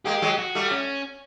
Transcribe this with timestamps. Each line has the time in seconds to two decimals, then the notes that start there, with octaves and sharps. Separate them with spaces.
0.05 G#3 A#3 G4
0.22 F#3 G#3
0.39 F#4
0.55 G3 A3
0.71 C#4